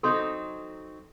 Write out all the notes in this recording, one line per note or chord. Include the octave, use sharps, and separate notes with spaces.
F#3 C4 D#4 A4 C6 D#6